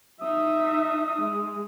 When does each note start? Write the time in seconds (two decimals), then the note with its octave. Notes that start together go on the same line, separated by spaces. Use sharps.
0.22 D#4 E5 D#6
1.22 G#3